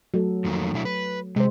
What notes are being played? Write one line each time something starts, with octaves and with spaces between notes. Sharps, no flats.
F#3 A3 A4
F2 D#3 A#3
B2 D4 E4
B4
C3 G#3 C5